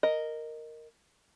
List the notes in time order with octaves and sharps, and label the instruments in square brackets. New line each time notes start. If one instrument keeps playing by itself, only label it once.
[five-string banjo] A#4 D#5